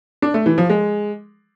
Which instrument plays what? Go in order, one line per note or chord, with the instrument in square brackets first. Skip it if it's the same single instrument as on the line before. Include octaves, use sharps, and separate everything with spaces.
[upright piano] D4
A3
E3
F3
G#3